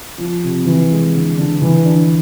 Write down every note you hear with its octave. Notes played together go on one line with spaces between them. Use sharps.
F3
C3
E3
G#3
D3
D3
E3
D4